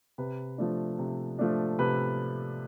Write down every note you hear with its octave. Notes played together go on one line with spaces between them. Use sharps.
C3 B4
F3 A3 D4
C3
F3 A3 D4
C3 B4